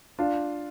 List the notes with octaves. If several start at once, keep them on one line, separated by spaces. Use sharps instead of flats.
D4 F4